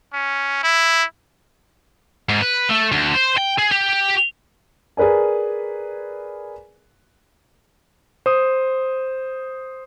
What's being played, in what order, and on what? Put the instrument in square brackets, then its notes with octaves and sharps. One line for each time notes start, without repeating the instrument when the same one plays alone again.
[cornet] C#4
E4
[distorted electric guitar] G#2
B4
A3
D2
C5
G5
G#4
G4
[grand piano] G#4 A#4 B4 D5 G#5
[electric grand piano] C5 D#6